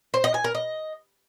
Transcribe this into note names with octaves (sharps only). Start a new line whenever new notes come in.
C5
D#5
G#5
A#4
D#5